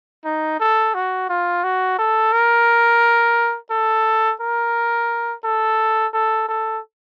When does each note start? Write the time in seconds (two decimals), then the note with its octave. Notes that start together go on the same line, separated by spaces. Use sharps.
0.25 D#4
0.60 A4
0.94 F#4
1.29 F4
1.64 F#4
1.99 A4
2.33 A#4
3.71 A4
4.41 A#4
5.45 A4
6.14 A4
6.48 A4